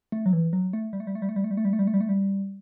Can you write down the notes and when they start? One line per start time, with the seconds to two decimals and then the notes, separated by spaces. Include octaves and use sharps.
0.12 A3
0.26 F#3
0.33 E3
0.53 F#3
0.73 A3
0.93 G3
1.00 A3
1.07 G3
1.15 A3
1.22 G3
1.29 A3
1.36 G3
1.44 A3
1.51 G3
1.57 A3
1.65 G3
1.73 A3
1.79 G3
1.87 A3
1.94 G3
2.01 A3
2.09 G3